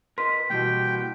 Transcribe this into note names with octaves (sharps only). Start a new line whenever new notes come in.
A#4 B4 D#5 C6 B6
B2 E3 G3 A#3 G5